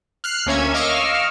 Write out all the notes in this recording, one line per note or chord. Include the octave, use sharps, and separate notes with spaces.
F6 F#6 C7
D2 A#3 C#4 C#5 E5 G#6
D#5 F5 C#6 D6 E6 F6